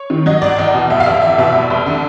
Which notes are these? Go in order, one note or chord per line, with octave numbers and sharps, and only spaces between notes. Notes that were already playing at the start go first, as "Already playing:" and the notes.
Already playing: C#5
D#3
F#3 D#5
G#1 D5
E2 D#5
B2
F1 E5
F5
F1 E5
E2 E5
B2 E5
F1
F1
D3